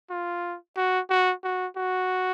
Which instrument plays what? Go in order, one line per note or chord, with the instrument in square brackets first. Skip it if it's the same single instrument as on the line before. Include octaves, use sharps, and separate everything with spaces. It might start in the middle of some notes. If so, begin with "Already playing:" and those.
[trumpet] F4
F#4
F#4
F#4
F#4